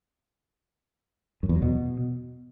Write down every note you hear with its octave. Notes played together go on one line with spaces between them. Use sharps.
F#2
E2
F#3
B2